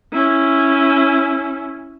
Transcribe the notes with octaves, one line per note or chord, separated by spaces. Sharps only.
C#4 E4